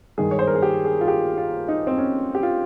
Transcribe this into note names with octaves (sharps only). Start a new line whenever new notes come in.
G2 D#3 G#3 G#4
C#5
C5
A#4
G#4
G4
G#4
F4
G4
F4
D#4
C4
C#4
G4
F4